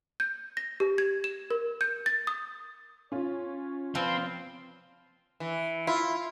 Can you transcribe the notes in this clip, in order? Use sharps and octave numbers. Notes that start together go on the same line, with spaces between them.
G6
A#6
G4
G#6
E7
A#4
G6
A6
D#6
C#4 F4 C#5
F3 C4 B4
E3
E4 F4